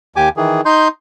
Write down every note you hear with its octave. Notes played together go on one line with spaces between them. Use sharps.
D#2 G4 G#5 D6
D#3 E3 G#4
D#4 C6 G6